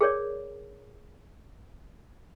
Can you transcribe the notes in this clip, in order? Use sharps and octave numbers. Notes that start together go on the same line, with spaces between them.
G#4 A#4 C#5 D5